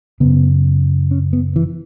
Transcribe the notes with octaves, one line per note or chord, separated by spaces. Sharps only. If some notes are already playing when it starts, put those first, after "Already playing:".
F#2 C#3 B3
C#4
B3
E3